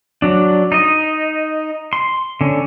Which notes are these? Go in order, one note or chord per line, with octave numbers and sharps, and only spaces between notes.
F#3 D4
D#4 D#5
C6
D3 C#4